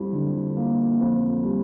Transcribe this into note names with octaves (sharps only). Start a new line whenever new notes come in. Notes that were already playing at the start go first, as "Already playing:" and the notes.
Already playing: F2 G3 E4
D3
A#3
F2
G3